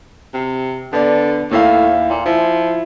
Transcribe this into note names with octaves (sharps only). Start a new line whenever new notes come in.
C3
D3 B3 D5
D#2 A2 E4 F5
A#2
F3 E4